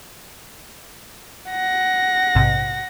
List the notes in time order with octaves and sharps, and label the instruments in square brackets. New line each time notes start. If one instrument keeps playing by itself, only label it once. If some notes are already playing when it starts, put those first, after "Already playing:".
[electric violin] F#5 A#6
[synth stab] A#1 G#2 C3